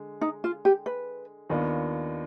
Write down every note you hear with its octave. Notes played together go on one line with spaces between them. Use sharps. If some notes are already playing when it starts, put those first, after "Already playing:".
Already playing: D3 G#3
D#4
F4
G4
B4
D#2 D#3 B3 D4 F4